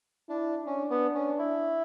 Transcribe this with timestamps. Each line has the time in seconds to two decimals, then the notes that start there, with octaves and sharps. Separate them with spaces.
0.29 D4 E4
0.65 C#4 D4
0.90 B3
1.14 C#4
1.39 E4